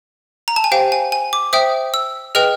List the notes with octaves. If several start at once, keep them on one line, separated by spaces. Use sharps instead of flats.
A#5
A5
G#5
G4 C5 F5 G5
G#5
G#5
D6
C5 E5 G5 D#6
E6
G#4 B4 D#5 G5 F6